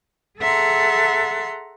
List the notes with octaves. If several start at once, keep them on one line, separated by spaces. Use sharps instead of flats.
G#4 A4 E5 F#5 A#5 C6